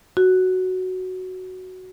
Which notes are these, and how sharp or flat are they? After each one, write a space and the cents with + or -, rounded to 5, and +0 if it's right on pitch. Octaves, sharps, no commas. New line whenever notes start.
F#4 +5